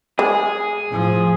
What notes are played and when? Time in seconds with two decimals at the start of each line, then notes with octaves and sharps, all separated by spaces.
0.19 G#3 G#4
0.89 A2 F3